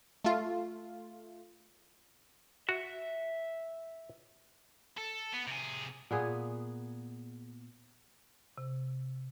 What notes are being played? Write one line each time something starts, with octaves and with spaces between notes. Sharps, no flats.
A3 F4
F#4 E5
A4
B3
C3 G#4
A#2 B3 G#4
C3